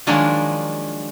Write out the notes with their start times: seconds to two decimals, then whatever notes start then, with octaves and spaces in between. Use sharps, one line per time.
0.07 D#3 F3 F#3 G#3 A#3 D4